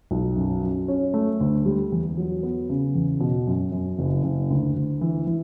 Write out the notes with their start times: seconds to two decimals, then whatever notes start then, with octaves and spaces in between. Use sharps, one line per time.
0.11 B1
0.36 F#2
0.63 F#2
0.88 C#4
1.14 A3
1.40 D2
1.66 G3
1.92 E2
2.17 F#3
2.43 B3
2.69 C#3
2.95 E2
3.20 B2
3.47 F#2
3.72 F#2
3.99 F#1
4.24 F#1
4.50 D2
4.76 D2
5.01 E3
5.27 E3